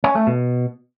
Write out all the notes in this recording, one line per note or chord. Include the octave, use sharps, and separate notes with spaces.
C#4
A3
B2